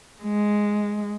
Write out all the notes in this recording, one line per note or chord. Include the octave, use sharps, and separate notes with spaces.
G#3